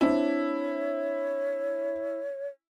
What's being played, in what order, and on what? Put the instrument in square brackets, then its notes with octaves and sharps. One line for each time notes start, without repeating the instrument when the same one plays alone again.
[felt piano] C4 D4 C5 [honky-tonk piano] E4 [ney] C#5